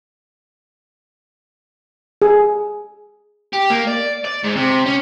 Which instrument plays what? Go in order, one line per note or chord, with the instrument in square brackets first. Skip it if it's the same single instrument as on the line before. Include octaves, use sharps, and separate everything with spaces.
[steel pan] G#4
[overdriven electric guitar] G4
A#3
D5
D5
G#2
C3
C#4